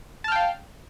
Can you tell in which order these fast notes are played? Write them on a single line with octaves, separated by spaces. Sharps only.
A5 F6 G5 F5